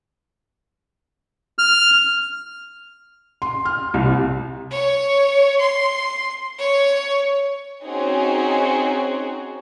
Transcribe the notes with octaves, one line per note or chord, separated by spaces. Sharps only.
F6
C6
F6
C2
C#5
C6
C#5
C4 C#4 D#4 F#4 G#4